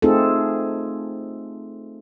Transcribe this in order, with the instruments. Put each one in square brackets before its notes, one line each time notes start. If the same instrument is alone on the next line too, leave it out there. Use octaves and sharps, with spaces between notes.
[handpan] A3 C4 D#4 F4 G#4 A4